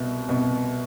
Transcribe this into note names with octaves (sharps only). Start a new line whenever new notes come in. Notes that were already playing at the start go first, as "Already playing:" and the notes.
Already playing: C2 B2
C2 B2